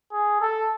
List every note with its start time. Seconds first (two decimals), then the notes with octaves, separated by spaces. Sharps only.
0.12 G#4
0.41 A4